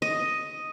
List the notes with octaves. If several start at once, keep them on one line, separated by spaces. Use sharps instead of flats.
D#5